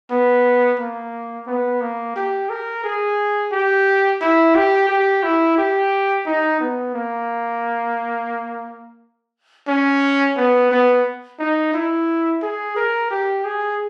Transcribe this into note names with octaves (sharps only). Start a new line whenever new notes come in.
B3
A#3
B3
A#3
G4
A#4
G#4
G4
E4
G4
G4
E4
G4
D#4
B3
A#3
C#4
B3
B3
D#4
E4
G#4
A#4
G4
G#4